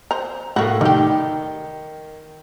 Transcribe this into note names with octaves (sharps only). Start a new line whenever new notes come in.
C5 A#5
A2 A#3 F#4
D#3 G3 G4